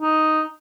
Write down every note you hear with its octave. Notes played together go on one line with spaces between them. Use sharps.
D#4